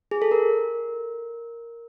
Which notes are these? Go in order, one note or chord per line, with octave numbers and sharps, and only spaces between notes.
G#4
A4
A#4